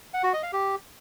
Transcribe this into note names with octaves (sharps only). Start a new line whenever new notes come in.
F#5
F#4
D#5
F5
G4